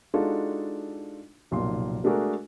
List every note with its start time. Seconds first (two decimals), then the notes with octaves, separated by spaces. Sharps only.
0.14 G#3 D4 D#4 F4 F#4 A4
1.51 F1 B1 A#2 D#4 C6
2.04 G#3 A3 D4 F#4 G#4 A#4